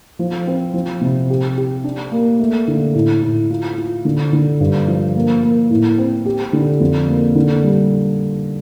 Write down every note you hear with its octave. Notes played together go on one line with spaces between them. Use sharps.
F3
C4
F3
C3
G4
G4
D4
A#3
A3
D3
A2
A2
F4
F4
D3
D3
G2
F3
A#3
A#3
A2
C4
G4
D3
F2
A#3
D3
G3